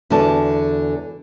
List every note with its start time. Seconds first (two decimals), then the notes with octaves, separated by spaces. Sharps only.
0.10 E2 D3 G#3 F#4 A5